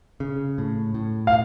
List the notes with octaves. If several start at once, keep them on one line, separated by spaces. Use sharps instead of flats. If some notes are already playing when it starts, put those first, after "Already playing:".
C#3
A2
A2
F5